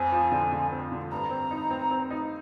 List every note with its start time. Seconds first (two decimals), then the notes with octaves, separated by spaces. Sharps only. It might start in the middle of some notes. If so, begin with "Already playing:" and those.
Already playing: F2 C4 G#5
0.12 F3
0.32 D3
0.52 D3
0.72 C4
0.92 D3
1.11 G2 A#5
1.31 C4
1.51 D#4
1.71 C4
1.91 C4
2.11 D#4